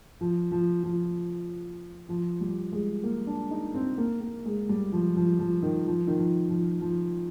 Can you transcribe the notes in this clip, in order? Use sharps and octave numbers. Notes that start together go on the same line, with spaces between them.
F3
F3
F3
F3
G3
G#3
A#3
D4
D#4
C4
A#3
A#3
G#3
G3
F3
F3
F3
D#3
F3
D#3
F3
F3
F3